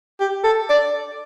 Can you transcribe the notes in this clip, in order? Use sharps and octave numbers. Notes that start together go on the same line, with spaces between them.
G4
A4
D5